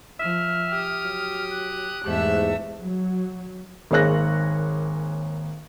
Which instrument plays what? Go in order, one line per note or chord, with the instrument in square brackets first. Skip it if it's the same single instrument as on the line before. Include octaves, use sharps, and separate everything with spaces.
[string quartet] F3 [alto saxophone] E5 [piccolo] F6
[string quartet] G4 D#6
[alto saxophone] F#3
[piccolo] F#6
[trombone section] E2 G#2 [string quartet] A3 E5 [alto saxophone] G4
[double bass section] F#3
[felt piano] G#1 A#3 G#4 C#5 F#6 A#6